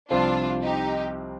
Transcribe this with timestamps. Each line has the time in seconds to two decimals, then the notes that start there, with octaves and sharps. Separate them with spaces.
0.10 C2 C3 F3 C4 D4 F4
0.64 D#4 G4